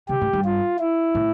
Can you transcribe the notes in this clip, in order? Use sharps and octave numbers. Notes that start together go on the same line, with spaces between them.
C#3 G4
A2
G2
F4
E4
A2